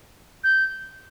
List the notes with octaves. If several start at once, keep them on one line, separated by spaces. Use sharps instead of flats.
G6